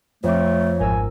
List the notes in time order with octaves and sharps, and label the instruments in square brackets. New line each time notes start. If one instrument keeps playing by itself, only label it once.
[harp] F2 D6 [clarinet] A3 [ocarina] C#5
[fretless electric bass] G#1 [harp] A#4 E6 [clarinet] G#5